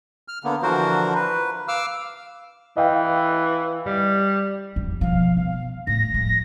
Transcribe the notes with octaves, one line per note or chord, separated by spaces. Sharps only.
F6
D3 A#3 B3
D3 E3 F3 F#4 A#4 C5
B4
F5 D6 E6 F6
E3 D#5 F5 G5
G3
F2 F#3
B2 F3 F5
B2 F5
A2 A#6
F3 G#3